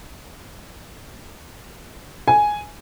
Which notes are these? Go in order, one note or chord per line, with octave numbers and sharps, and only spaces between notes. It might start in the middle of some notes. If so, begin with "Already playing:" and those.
G#5